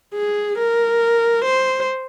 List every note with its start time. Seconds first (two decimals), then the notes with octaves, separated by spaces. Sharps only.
0.15 G#4
0.58 A#4
1.45 C5